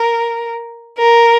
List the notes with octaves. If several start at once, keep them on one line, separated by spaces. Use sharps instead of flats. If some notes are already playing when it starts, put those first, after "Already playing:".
Already playing: A#4
A#4